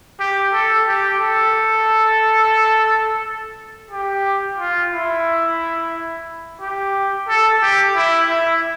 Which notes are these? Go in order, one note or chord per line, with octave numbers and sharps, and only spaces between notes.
G4
A4
G4
A4
G4
F4
E4
G4
A4
G4
E4
E4